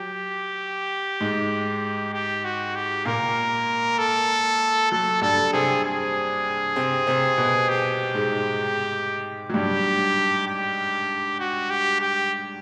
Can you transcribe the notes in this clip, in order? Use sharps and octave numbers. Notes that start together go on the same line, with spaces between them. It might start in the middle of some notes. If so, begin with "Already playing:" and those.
Already playing: F#3 G4
G#2 G#3
G4
F#4
G4
A#2 A#3 A#4
A4
F#3 A4
G2 G3 A4
C3 C4 G#4
G#4
C3 C4
C3 C4
B2 B3
G4
G#2 G#3
F#3
G2 G3 G4
G4
F#4
G4
G4